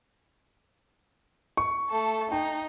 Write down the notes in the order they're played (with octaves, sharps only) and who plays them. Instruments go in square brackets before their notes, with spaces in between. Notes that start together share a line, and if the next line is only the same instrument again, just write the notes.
[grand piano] C#6
[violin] A3 A4
[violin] D#4 [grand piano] G5